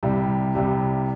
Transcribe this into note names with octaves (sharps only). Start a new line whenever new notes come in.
C2 C3 G3
C2 C3 G3